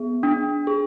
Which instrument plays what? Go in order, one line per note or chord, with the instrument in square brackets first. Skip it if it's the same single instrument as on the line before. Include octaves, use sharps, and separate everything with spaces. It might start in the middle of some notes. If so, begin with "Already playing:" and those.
Already playing: [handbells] B3 G#4
D4
G#4